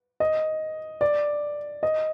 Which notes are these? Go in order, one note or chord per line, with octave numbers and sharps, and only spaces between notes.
D#5
D5
D#5